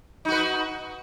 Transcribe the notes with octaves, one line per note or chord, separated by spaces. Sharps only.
D#4 F#4 B4